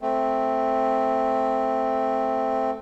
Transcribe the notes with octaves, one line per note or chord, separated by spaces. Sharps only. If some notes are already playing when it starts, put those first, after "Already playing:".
A3 C4